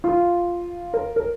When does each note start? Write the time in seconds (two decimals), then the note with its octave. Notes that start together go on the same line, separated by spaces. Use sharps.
0.04 F4
0.94 A#4
1.16 A#4